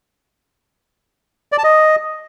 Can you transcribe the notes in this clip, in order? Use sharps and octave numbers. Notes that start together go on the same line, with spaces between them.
D5
A5
D#5